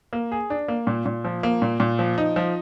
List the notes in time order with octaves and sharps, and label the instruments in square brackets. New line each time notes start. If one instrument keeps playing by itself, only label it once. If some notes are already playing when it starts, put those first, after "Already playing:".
[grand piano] A#3
G#4
D4
A#3
A#2
A#2
F3
A#3
A#2
A#2
F3
D#4
F3